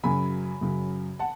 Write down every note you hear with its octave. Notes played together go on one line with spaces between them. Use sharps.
F#2 C#3 F#3 G#5 B5
F#2 C#3 F#3
F#5 A5